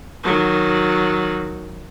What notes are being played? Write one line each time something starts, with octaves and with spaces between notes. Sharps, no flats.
D#3 F#3